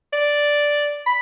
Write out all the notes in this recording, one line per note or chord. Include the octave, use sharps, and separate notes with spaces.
D5
B5